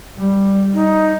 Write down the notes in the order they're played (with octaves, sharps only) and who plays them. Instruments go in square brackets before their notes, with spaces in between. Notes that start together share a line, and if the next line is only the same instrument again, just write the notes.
[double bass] G3
[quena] D#4